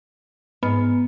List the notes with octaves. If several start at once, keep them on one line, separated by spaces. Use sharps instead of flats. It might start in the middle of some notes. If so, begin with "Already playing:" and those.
G#2 B3